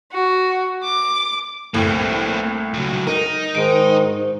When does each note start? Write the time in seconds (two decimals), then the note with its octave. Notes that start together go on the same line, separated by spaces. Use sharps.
0.13 F#4
0.84 D6
1.74 C2 A2 A#3 C4
2.74 C#2 F#3
3.07 D#4 A#4
3.55 G#2 D#3 G#3 D7
4.12 G#2